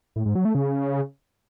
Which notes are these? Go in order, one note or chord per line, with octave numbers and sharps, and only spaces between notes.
A2
G#2
F#3
A3
C#3